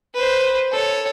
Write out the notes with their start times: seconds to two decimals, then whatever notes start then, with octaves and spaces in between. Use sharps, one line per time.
0.15 B4 C5
0.72 A4 C#5